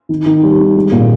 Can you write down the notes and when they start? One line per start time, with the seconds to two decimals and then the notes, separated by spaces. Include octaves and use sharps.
0.09 D#3
0.26 D#3
0.43 G3
0.59 D#3
0.76 G#3
0.92 A#2